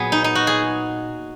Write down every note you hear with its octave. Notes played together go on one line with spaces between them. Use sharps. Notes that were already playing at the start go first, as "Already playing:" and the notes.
Already playing: A#2 F#3 B3 G#4
D#4
D#4
F#4
G#4